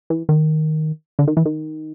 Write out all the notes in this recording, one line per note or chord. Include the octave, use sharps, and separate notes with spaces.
E3
D#3
D3
D#3
E3
D#3